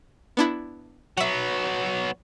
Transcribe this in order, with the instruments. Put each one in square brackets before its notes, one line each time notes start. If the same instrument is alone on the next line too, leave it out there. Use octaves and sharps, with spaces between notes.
[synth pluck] B3 D4 E4
[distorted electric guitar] F#3 B3 [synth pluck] E5 F#5